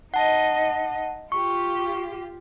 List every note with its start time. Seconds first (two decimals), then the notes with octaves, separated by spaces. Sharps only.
0.14 D#4 D#5 F#5 A5
1.32 F4 G4 C#6